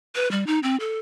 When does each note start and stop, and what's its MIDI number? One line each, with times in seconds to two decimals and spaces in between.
0.15 0.30 71
0.31 0.47 55
0.47 0.59 63
0.63 0.76 60
0.80 0.99 69